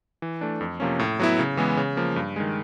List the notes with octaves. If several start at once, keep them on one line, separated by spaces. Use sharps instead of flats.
E3
A3 D4
F2
C3 F3 A#3 C#4
A2
F#3 B3 E4
C#3
E3 G#3 B3
C#3
F3 A#3
G2
D#3 G#3